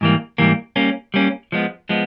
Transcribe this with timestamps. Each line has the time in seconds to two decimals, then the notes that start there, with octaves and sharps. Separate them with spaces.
0.01 G#2 E3 G3 A#3
0.38 G#2 E3 G3 A#3
0.76 G3 A#3 C#4
1.14 G3 A#3 C#4
1.52 F3 G#3 B3
1.89 F3 G#3 B3